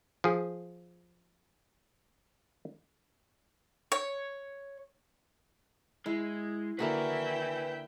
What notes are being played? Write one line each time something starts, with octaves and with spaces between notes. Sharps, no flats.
F3 G#4
C#5
G#3 E4
D3 A#3 E4 F#4 B4 G5 G#5